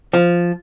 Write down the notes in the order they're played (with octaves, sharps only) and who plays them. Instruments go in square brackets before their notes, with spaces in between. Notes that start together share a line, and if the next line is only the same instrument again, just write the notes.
[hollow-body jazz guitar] F3